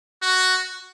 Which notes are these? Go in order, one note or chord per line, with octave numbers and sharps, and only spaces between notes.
F#4